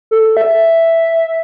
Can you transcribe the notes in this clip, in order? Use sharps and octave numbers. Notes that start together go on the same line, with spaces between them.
A4
E5